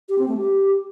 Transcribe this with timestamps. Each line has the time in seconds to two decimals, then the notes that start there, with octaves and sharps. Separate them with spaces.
0.09 G4
0.19 C4
0.28 A3
0.38 G4